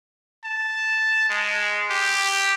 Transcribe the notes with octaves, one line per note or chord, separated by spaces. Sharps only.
A5
G#3
G4